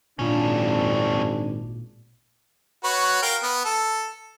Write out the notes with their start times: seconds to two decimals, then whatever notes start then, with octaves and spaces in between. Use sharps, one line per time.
0.19 G#1 F2 A#2 C#4 D4 F4 F5
2.84 F#4 B4 C#5
3.23 A#4 F5 G5
3.43 B3
3.65 A4